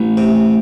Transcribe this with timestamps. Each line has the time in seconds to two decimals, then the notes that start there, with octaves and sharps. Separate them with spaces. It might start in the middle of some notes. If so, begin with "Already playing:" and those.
Already playing: A1
0.17 C3